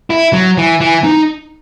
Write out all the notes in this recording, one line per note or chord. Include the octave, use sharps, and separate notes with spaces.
E4
F#3
E3
E3
D#4